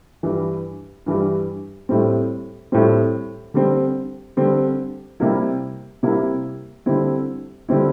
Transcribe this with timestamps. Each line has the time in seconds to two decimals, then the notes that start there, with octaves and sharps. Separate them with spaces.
0.23 G2 E3 G3
1.06 G2 E3 G3
1.89 A2 G3 C4
2.72 A2 G3 C4
3.54 D3 G3 C4
4.37 D3 G3 C4
5.20 C3 G3 A#3 E4
6.03 C3 G3 A#3 E4
6.86 D3 G3 C4 E4
7.69 D3 G3 C4 E4